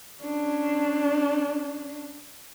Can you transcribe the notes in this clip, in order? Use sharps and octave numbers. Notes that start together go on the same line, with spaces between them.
C#4 D4